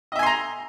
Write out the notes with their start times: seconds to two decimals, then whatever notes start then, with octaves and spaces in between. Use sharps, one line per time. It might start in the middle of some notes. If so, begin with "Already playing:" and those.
0.12 D#5
0.16 E5
0.19 G#5
0.23 C6
0.26 A#5